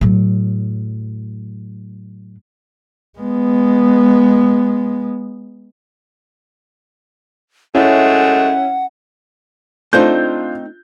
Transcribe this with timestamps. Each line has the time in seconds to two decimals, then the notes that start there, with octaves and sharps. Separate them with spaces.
0.01 A2 F#3
3.19 G#3 B3
7.75 F#2 G#3 A3 C#4 E4 F#5
9.93 A3 C4 D4 D#4 F4 G6